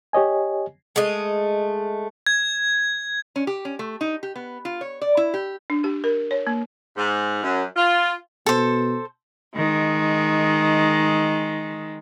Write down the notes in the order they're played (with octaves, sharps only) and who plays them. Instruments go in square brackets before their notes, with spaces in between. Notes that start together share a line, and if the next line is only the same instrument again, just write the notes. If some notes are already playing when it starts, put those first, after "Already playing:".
[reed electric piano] G4 C#5 D#5 G#5
[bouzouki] G#3 A3 D#5
[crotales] G#6
[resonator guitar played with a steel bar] C#4
G4
C#4
A3
D#4
G4
B3
F4
C#5
D5
E4
G4
[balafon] D4
G4
A#4
C#5
A#3
[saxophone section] G#2
F#2
F4
[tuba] B2 [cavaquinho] A4 C5
[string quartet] D#3 G#3